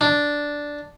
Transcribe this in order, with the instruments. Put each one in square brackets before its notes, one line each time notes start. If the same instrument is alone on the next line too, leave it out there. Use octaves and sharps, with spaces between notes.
[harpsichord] D4